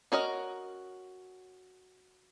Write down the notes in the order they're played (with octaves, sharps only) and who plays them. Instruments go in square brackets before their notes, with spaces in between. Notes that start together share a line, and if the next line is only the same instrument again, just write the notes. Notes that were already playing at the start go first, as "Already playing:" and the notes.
[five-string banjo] C#4 F#4 A#4 D#5